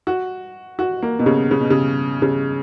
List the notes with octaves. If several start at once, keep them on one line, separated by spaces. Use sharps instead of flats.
F#4
F#4
A#3
B2
C#3
C#3
B2
C#3
C#3